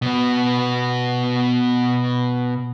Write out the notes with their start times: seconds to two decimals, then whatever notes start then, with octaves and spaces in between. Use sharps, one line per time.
0.02 B2 B3